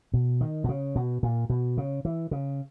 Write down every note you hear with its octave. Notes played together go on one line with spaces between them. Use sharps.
B2
D#3
B2
C#3
B2
A#2
B2
C#3
E3
C#3